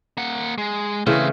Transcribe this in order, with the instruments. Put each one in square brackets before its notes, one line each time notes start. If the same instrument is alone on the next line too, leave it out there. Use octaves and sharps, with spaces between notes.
[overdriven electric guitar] A#3 F#5
G#3
[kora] C#3 E3 A3 [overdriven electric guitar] C4 G#4